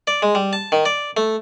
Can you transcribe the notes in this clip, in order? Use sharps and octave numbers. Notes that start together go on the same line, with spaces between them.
D5
G#3
G3
A5
D#3
D5
A3